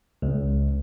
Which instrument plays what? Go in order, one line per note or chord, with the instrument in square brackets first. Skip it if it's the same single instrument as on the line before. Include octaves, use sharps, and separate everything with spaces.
[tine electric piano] C#2